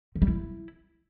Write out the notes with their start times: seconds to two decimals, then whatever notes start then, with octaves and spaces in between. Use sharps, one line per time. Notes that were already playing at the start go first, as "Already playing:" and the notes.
0.16 D#3
0.22 G3
0.28 E4